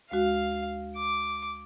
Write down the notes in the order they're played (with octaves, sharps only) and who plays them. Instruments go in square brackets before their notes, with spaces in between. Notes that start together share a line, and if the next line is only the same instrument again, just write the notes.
[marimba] D2 G#3 F#4 [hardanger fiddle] F5
[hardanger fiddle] D6